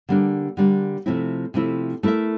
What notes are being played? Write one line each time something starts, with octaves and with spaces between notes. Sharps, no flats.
D3 G3 A#3 D4
D3 G3 A#3 D4
C3 F3 A3 C4 E4
C3 F3 A3 C4 E4
A3 E4 A#4 E5